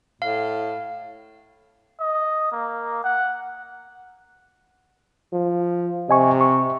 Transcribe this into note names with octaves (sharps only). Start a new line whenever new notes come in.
A2 F5
D#5
A#3
F#5
F3
C3 D#5 G#5 C#6
C#6